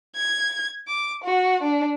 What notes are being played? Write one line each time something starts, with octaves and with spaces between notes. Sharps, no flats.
G#6
D6
F#4
D4